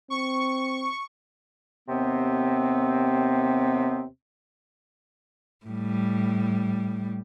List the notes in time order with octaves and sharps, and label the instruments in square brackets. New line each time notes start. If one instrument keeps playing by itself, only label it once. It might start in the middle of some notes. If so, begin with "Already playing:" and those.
[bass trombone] C4 [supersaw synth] C#6
[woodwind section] D#2 C3 B3 C4
[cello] A2 G3